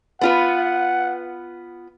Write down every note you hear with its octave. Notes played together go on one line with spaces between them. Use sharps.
B3 F4 B4 F#5